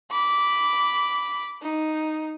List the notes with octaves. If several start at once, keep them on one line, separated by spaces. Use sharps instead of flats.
B5 D6
D#4